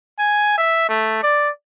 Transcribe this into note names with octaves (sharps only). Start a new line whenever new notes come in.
G#5
E5
A3
D5